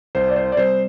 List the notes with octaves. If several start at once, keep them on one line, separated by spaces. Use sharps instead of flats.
C2 C5
D5
C5
D5
C3 G3 C5